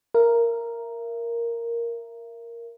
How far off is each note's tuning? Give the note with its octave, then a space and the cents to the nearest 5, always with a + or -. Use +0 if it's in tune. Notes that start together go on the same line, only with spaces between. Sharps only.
A#4 +0 E5 +35